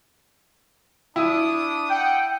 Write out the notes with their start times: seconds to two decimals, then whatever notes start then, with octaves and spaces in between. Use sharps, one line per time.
1.16 D4 E4 D#6
1.90 F#5 G5